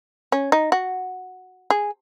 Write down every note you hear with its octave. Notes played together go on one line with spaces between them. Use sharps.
C#4
D#4
F#4
G#4